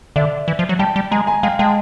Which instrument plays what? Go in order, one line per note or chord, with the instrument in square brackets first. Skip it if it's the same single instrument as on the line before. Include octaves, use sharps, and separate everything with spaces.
[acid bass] D3 [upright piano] D5 E5
[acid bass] E3
F3
F#3
[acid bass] G3 [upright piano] G5 A5
[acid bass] G3
[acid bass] G#3 [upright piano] G#5 A#5
[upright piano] G#5 A#5
[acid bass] G#3 [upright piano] F5 G5
[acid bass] G#3 [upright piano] G5 A5